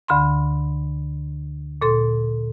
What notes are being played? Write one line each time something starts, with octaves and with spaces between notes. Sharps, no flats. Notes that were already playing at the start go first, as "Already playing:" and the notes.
D2 D3 B5 C6
A#2 A4 C6